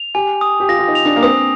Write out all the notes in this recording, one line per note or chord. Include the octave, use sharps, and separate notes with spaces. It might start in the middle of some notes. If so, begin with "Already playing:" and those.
Already playing: F7
G4 G#5
D#6
G4
F4 A#6
F4
D#4
F7
D4
A#3
C4 D#6